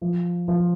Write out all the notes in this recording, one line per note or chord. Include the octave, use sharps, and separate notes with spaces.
F3
F3